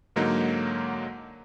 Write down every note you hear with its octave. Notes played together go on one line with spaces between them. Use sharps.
G#2 D3 F#3 A#3 D#4 C#5